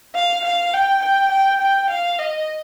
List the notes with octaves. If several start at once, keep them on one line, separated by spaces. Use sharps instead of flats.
F5
F5
G5
G5
G5
G5
F5
D#5